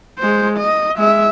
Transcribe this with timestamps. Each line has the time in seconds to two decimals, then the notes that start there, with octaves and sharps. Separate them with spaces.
0.19 G#3 C5
0.57 D#5
0.98 G#3 E5